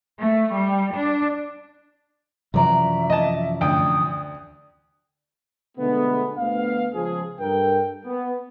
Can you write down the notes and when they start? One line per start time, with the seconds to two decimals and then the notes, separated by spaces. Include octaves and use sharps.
0.20 A3
0.56 G3
0.94 D4
2.54 F#2 C3 E3 F3 D5 E5 A#5
3.10 D#5 A5
3.61 D2 G5 D#6
5.77 B2 D3 G#3 A3 B3
6.38 D2 B3 F5
6.94 C#2 F3 G#4
7.39 G2 A4 A#4 G5
8.06 B3